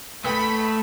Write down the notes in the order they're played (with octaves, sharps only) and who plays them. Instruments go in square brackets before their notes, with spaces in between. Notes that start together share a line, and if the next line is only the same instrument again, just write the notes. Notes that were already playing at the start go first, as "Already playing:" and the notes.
[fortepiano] C#2 B4 G5 [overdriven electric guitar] A3 [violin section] B5